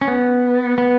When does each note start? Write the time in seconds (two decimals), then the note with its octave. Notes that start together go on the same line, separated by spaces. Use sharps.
0.01 C#4
0.08 B3
0.78 B3